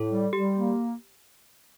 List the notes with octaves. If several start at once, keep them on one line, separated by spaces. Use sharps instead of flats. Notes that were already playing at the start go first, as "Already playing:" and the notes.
Already playing: A2 A4
G3
G3 G4
A#3